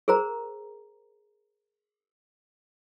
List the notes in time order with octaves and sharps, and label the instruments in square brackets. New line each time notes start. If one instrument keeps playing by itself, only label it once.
[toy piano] G#4 A#4 C5 A#5